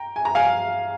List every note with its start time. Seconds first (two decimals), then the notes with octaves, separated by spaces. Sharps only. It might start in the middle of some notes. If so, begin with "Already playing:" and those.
Already playing: G5 A#5
0.16 G#5
0.25 A#5
0.35 F5 G#5